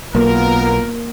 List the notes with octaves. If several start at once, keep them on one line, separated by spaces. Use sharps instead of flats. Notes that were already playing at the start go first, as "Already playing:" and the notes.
B1 A#3 B3 F4 A#4